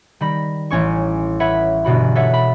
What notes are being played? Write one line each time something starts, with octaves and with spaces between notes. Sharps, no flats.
D#3 G3 B5 A#6
A1 C#4 C#5 C#6
B4 C#5 E5 F#5 B5
G1 B2 F#4 B5
A4 B4 C#5 E5 F#5
B5